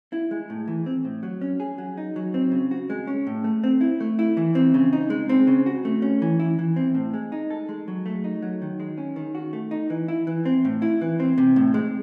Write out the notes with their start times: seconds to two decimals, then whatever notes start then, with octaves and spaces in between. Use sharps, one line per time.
0.13 E4
0.31 G#3
0.50 A2
0.68 E3
0.86 C4
1.05 A2
1.23 F#3
1.41 C#4
1.60 G#4
1.78 F#3
1.97 D#4
2.16 F#3
2.34 C4
2.52 C#3
2.71 F#4
2.90 G#3
3.07 C#4
3.27 A2
3.44 A3
3.64 C4
3.81 E4
4.00 A3
4.19 E4
4.37 E3
4.55 C4
4.74 C#3
4.93 D#4
5.10 G#3
5.29 C4
5.47 C#3
5.66 F#4
5.85 A3
6.02 C#4
6.22 E3
6.39 E4
6.59 E3
6.76 C4
6.95 A2
7.14 G#3
7.32 D#4
7.50 A4
7.69 G#3
7.88 F#3
8.06 A3
8.24 D#4
8.42 F#3
8.62 D#3
8.80 G#3
8.98 C#4
9.16 D#3
9.35 F#4
9.53 A3
9.71 D#4
9.90 E3
10.08 E4
10.27 E3
10.45 C4
10.65 A2
10.82 E4
11.01 E3
11.20 C4
11.38 C3
11.56 A2
11.74 G#3